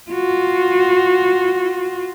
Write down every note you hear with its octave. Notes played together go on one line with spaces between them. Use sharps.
F4 F#4